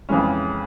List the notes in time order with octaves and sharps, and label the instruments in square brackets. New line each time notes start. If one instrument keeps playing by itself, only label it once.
[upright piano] F2 C#3 E3 G#3 C#4